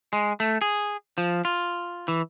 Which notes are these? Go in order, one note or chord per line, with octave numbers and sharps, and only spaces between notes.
G#3
A3
G#4
F3
F4
E3